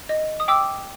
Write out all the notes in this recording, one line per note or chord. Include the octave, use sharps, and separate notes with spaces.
D#5
D#6
G5 D6 E6